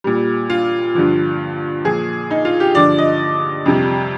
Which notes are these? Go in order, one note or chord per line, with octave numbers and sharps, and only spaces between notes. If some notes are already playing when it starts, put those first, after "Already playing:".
A#2 G3
F4
G2 D3 F3
A#2 F3 G#4
D#4
F4
G4
G2 D3 F3 D5
D#5
F2 C3 G3